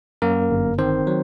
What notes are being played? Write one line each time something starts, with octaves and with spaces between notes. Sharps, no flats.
F#2 A#3 A#4
G1
D#3 C4 C5
F#3